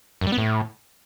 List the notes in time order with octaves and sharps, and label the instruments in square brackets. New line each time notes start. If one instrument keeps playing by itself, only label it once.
[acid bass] F#2
G3
B3
A2